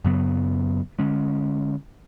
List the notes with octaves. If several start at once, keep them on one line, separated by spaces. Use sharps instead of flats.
F#2 C#3 F#3 B3
D3 G#3 C#4